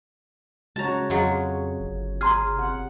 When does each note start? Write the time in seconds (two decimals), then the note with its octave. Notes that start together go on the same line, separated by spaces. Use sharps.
0.76 C#3 G#3 F#4 C#5 A5 A#5
1.10 F2 F#3 G#3 F4
1.80 G1
2.21 G#4 A#5 C6 F6
2.56 C3 F#5